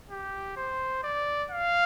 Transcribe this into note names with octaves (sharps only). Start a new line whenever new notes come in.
G4
C5
D5
F5